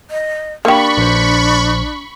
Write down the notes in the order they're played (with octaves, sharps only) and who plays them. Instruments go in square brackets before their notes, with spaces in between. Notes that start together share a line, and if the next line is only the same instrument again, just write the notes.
[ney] D#5
[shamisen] A#3 G4 [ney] D4 [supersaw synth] B5 C#6
[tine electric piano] A#1 C5